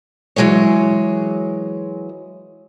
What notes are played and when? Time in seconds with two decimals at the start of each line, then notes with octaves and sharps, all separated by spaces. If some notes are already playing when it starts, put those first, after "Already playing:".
0.36 E3 F#3 G#3 G#4 C#5